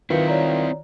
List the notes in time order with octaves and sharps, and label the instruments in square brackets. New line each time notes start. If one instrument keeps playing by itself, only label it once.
[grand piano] D#3 F4 [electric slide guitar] C4 E4 [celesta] B4 C#7
[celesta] C#5 D5 A#5